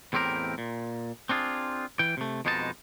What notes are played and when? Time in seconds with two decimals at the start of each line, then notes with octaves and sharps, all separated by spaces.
0.13 E2 A2 C4 G4 A#4
0.58 A#2
1.29 C4 D4 F4 G#4
1.99 E3 G5
2.17 C3 A3
2.45 F2 B2 G#3 D#4 G#4 A5